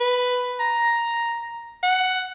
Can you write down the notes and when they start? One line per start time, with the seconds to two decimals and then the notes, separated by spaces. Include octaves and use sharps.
0.01 B4
0.60 A#5
1.83 F#5